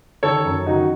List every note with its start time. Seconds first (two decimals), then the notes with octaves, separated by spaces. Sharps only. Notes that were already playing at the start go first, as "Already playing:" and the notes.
0.23 D#3 A4 C#5
0.45 F#2
0.66 D#3 D#4 F#4